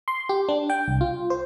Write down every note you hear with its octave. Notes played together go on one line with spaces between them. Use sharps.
C6
G4
D4
G5
C2
F4
C5